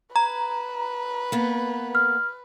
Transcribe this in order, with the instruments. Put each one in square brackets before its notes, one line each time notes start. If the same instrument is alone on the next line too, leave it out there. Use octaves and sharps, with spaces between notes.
[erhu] B4 [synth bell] A#5
[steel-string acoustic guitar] A#3 B3
[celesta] F6